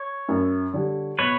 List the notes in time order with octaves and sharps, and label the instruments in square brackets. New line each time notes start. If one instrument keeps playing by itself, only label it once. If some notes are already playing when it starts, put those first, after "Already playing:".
Already playing: [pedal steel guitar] C#5
[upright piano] F#2
D3 G3
[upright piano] B2 [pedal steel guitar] B4 C#5